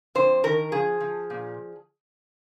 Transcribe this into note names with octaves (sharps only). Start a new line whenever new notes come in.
F2 C5
D#3 A#4
F3 G#4
F3
A#2